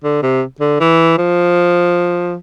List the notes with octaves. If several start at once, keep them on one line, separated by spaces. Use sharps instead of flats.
D3
C3
D3
E3
F3